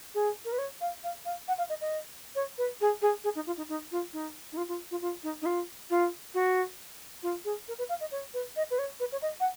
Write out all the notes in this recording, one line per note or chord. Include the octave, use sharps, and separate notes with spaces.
G#4
A#4
B4
C#5
F5
F5
F5
F#5
F5
D#5
D#5
C#5
B4
G#4
G#4
G#4
D#4
F4
D#4
D#4
F4
D#4
D#4
F4
F4
F4
F4
D#4
D#4
F4
F4
F#4
F4
G#4
A#4
B4
F5
D#5
C#5
B4
D#5
B4
C#5
B4
C#5
D#5
F#5